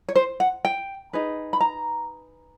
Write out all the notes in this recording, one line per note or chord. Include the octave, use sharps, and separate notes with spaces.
C#5
C5
F#5
G5
D#4 G#4 B4
B5
A#5